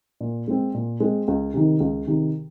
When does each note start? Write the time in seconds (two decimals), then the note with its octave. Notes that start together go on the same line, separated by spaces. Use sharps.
0.20 A#2
0.48 G#3 C4
0.74 A#2
1.00 G#3 C4
1.28 C#2
1.54 C3 D#3
1.80 C#2
2.07 C3 D#3